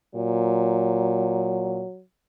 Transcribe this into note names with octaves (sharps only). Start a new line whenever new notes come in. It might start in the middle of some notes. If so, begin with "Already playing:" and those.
A#2 F#3